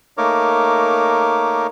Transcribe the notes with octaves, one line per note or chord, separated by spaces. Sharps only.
A3 A#3 D#4 A#4 C#5 D6